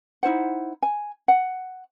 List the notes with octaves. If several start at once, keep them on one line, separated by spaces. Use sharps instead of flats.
D#4 E4 C5 F#5
G#5
F#5